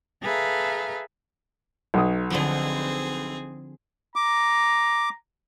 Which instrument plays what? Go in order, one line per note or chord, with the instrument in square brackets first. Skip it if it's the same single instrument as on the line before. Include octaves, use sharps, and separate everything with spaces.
[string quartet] G#4 A4 B4 E5 F5 A#5
[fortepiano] B1 D#6
[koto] D3 F3 [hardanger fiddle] C4 G#4
[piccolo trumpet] A#5 [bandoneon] D6